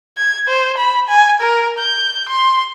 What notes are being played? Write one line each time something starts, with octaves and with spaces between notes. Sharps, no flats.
G#6
C5
B5
G#5
A#4
G6
C6